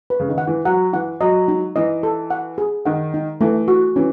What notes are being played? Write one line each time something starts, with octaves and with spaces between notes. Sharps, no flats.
B4
C#3
D#3
F#5
E3
F#3 F#5
E3 F#5
F#3 D#5
D#4
E3 D#5
A4
F#5
G#4
D#3 F#5
D#4
E3 A3
F#4
E3 C#4